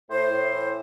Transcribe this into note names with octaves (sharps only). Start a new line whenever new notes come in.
A2 C5
A2
E3